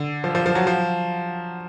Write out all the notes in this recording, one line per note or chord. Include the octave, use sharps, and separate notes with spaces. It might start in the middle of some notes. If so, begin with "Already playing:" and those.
Already playing: D3
F3
F3
F3
F#3
F3